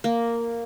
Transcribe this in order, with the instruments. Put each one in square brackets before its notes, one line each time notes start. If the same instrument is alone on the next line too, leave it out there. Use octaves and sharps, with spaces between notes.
[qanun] A#3